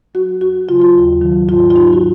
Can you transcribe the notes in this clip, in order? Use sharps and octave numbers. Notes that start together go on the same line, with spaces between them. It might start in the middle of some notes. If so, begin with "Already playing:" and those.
F#3 F#4
F2 F#4
C#3 F#3 F4
F4
D#2
D#3 F#3
G#2 F4
F4
F#3 D#4
F#4